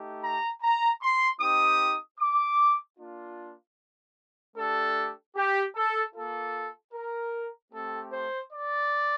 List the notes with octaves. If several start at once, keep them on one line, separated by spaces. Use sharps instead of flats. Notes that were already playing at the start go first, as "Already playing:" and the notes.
Already playing: A3 D#4 G4
A#5
A#5
C6
C4 D#4 G4 D#6
D6
A#3 D4 F4
A3 D4 G4 A4
G4
A4
A#3 F4 A4
A#4
A3 C4 G4 A4
C5
D5